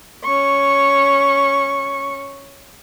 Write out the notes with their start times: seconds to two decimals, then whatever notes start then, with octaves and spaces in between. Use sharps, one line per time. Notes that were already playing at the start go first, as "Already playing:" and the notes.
0.24 C#4 C#6